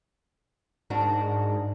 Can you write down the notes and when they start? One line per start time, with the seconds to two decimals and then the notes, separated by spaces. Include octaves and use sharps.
0.90 G#2 D4 F#4 A#4